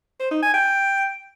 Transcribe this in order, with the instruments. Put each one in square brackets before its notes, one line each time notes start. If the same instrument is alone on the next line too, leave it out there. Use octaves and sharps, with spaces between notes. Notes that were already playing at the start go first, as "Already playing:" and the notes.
[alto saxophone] C5
D#4
G#5
G5